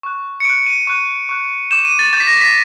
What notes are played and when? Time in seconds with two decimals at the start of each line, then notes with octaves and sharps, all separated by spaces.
0.03 C#6 F#6
0.40 C#7
0.45 C#6 F#6 D7
0.67 D#7
0.87 C#6 F#6 D#7
1.29 C#6 F#6
1.71 D6 G6 E7
1.85 D#7
1.99 A6
2.13 D6 G6 A6
2.20 B6
2.27 A#6
2.41 B6